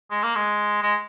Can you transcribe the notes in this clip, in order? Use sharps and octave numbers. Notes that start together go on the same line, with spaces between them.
G#3
A#3
G#3
G#3